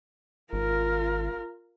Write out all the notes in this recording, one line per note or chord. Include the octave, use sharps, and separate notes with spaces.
G#1 F4 A#4